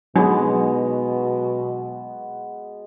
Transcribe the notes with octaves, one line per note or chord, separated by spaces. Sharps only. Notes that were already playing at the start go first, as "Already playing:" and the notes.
B2 F#3 G#3 B3 D4 D#4 F#4 G#4